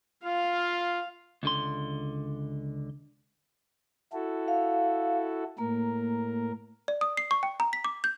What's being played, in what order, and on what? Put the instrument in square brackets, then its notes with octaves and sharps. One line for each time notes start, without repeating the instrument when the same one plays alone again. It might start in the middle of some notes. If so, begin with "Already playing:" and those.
[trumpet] F4 [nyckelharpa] F5
[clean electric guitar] C#2 D3 C6
[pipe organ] E4 F#4 A4
[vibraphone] F5
[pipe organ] A2 A#4 [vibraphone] A#3
[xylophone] D5
D#6
C7
C#6
G5
A#5
B6
D6
G6